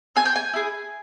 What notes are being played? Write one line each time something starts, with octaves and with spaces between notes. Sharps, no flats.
C4 G#5
G5
G#5
E4 G#4